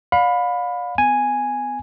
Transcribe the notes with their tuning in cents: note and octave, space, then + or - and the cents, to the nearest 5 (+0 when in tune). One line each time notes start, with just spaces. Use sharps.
D5 +0 F5 +35 B5 +5
B3 +35 G#5 +0